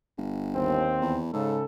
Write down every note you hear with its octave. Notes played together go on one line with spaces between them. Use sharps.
G1
D#2 C4
E2
G#2 C#3 A4